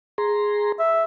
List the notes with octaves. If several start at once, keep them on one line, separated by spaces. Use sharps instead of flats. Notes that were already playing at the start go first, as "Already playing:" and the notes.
G#4 A#5 C6
E5